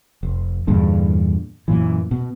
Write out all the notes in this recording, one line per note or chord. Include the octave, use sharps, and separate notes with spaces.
F1
E2 G2 A#2 D3
F#2 A#2 E3
B2